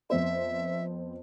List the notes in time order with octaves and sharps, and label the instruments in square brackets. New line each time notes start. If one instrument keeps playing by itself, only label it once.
[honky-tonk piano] F2 B3 C5 [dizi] E5